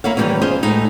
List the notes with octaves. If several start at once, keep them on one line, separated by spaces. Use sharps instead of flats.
A#3 E4 C#5 F5
D#3 E3 G3 G#3 A#3 C#4
F4 G#4 C5 D#5
A2 G#3 D#4